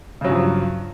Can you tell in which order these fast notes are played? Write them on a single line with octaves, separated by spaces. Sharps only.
C#3 F#3 G2 F3